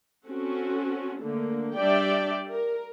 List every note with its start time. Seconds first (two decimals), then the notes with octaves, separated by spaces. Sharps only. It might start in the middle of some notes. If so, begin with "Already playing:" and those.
0.28 C4 C#4 F#4 A4
1.22 D3 A3 A#3
1.75 G3 D4 D5 E5 G5
2.50 A#4